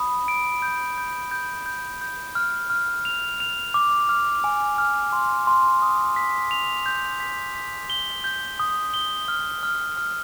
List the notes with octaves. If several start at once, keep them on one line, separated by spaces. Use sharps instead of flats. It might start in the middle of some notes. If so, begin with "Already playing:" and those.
Already playing: B5 D#6
D7
G6
G6
G6
G6
G6
F6
F6
F7
F7
D6
F6
G#5
F6
C6
C6
D#6
B6
F7
G6
B6
B6
G7
G6
D#6
G7
F6
F6
F6